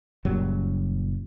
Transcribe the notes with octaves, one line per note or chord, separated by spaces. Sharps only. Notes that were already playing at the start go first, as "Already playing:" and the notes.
F#1 A#2 F#3 G3